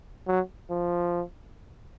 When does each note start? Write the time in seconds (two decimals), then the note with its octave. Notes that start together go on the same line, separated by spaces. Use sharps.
0.27 F#3
0.71 F3